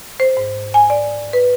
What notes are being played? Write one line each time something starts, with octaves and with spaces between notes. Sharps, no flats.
C5
G#2
G#5
D5
B4